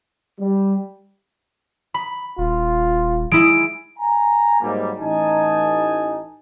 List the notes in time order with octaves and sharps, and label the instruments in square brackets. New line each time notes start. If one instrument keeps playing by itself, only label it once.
[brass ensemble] G3
[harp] B5
[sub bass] D#1 [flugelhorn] F4
[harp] G#3 E4 [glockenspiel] D7
[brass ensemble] G#5 A#5
G#2 F#3 G3 A#3
A1 D#4 G#5 A5